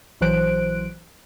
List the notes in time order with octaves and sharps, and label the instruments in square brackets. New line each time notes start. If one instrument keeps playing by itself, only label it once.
[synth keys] A#1 E3 F#3 C5 F#6 D7